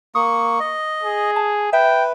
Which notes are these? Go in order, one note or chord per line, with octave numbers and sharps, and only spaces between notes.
A#3 C#6 D#6
D#5
G#4
A5
B4 E5 G5